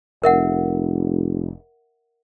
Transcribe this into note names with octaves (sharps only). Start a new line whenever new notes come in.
F1 A#4 E5 F#5